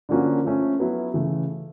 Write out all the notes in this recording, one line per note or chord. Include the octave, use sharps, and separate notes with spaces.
D3 F3 A#3 C#4 F#4
F3 A3 C#4
F#3 B3 E4
C#3 E3 A3